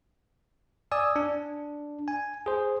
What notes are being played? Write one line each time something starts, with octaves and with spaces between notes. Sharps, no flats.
D5 G#5 D#6 E6
D4
G#5
G#4 C5